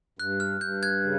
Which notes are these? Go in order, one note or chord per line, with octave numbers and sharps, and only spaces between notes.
G2 F#6
F6
G2 G6
F#6 G#6
C#3